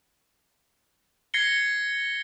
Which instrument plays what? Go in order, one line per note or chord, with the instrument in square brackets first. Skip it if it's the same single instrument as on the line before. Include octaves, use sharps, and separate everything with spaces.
[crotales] G#6 A#6 C7 C#7 G7